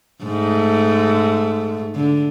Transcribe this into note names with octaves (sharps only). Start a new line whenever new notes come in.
G#2 A3
D3